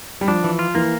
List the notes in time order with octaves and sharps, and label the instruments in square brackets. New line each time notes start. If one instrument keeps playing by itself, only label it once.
[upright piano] G3
[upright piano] F3 [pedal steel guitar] D4
[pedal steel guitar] E3
F4
[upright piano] E3 [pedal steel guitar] A#3